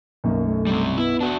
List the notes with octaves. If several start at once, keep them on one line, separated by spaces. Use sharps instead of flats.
B1 F#2 A#3
A3
G3 C4
B3 E4
D4 F#4